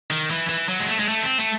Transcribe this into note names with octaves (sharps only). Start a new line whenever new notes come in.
D#3
E3
E3
F#3
G#3
A3
G#3
A3
C4
A3